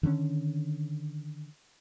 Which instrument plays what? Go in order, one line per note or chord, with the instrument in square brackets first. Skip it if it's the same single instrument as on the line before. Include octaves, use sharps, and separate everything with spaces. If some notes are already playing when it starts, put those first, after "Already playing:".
[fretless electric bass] D3 D#3 G3 C#4